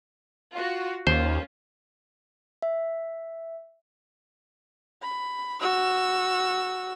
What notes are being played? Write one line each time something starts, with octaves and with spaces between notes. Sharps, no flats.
F4 F#4
D#2 C#4 F4 C5
E5
B5
F#4 E6